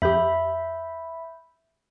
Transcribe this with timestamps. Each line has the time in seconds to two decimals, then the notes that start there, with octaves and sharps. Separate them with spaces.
0.02 F2 G4 E5 B5 G6